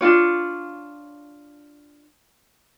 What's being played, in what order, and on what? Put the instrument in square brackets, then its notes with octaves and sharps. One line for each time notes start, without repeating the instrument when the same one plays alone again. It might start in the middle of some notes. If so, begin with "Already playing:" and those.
[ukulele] D4 D#4 F4 C#5